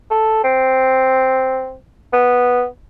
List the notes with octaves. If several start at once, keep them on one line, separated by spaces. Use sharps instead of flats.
A4
C4
B3